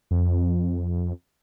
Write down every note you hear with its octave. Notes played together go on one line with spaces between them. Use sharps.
F2